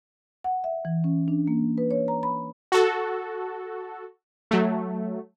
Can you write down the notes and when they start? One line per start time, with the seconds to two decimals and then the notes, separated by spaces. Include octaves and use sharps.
0.44 F#5
0.64 E5
0.85 E3
1.04 C#4
1.28 D4
1.48 A#3
1.78 B4
1.91 C#5
2.08 A#5
2.23 B5
2.72 F#4 A4
4.51 F#3 A3